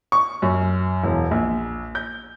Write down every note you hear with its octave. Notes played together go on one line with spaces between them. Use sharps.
C#6
F#2
E1
A#1
G6